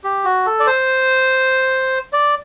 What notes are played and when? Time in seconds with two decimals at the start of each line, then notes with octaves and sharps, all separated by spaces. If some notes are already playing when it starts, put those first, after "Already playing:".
0.04 G4
0.24 F#4
0.46 A4
0.60 D5
0.67 C5
2.13 D5